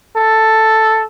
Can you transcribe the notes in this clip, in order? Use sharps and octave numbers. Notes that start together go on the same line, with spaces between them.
A4